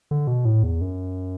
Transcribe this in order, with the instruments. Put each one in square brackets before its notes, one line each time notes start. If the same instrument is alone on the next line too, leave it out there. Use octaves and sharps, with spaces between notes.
[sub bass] D3
B2
A2
E2
F#2